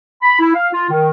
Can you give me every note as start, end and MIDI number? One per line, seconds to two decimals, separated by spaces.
0.22 0.36 83
0.39 0.50 64
0.54 0.67 77
0.73 0.90 65
0.90 1.10 51